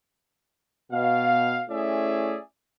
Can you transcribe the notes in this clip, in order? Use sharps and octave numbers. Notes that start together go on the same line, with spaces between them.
B2 F5
A3 C#4 E4 G#4 D5 E5